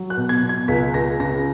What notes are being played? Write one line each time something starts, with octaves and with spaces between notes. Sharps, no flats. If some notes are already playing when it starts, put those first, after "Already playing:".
Already playing: F#3
F#6
B2
G#6
B2
G#6
C#2 B6
C#2 A#6
C#3 A#6